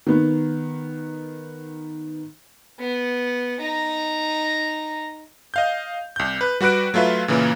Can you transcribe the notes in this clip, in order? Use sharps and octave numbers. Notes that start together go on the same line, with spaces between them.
D#3 B3
B3
D#4 A#5
D#5 F5 G6
C2 G6
B4
G3 F#4 B4 F#6 D7
F#3 A3 F4 B4 E5
A#2 C#3 E3 A#3